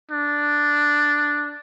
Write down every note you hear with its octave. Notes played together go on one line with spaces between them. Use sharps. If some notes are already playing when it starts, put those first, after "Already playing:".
D4